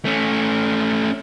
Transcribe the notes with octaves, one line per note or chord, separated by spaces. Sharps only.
A3 C#4